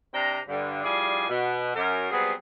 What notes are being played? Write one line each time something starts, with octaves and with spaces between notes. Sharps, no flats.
C3 C4 D4 G5 A#5
G2 D3
F3 G3 E4 G#4 D5 G#5
B2
F#2 A#4
F#3 G3 B3 C4 G#4